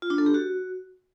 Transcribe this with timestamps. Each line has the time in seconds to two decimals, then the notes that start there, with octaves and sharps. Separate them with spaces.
0.02 F4
0.10 D4
0.18 A4
0.26 G4
0.34 F#4